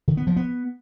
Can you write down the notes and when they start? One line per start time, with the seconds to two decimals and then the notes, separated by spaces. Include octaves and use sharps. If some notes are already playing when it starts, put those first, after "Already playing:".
0.08 D#3
0.17 B3
0.27 F3
0.37 B3